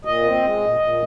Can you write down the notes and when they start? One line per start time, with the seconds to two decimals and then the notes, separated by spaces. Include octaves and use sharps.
0.05 A#2 D#5
0.23 C4
0.42 G#3
0.61 A#2
0.80 A#2